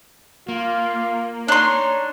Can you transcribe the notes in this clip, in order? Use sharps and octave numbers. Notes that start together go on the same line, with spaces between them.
A#3 F4
D4 D#4 C#5 C6